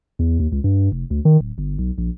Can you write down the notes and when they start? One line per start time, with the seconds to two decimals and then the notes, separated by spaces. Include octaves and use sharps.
0.19 E2
0.40 D#2
0.52 C#2
0.64 G2
0.92 F1
1.10 D2
1.25 D#3
1.40 D1
1.58 G1
1.78 B1
1.98 A#1